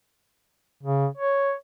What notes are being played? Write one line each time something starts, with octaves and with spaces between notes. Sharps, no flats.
C#3
C#5